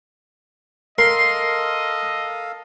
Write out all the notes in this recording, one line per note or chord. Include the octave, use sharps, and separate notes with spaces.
A4 A#4 D#5 F5 C6